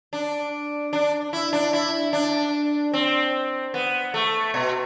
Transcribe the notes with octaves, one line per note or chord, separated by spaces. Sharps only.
D4
D4
E4
D4
E4
D4
C4
B3
A3
B2